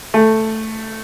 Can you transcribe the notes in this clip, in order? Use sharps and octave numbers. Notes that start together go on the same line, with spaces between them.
A3